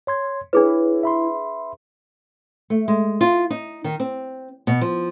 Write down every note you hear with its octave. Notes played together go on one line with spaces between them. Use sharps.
C#5 C6 G#6
D4 E4 G#4 B4 C#5
E5 B5 C6
A3
G#3
F4
D#4
D#3
C4
B2
F3